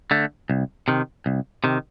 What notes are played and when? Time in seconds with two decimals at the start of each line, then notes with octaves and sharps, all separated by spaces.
0.11 D3 A3
0.50 C2
0.88 C3 D#3
1.26 C2
1.64 C3 D#3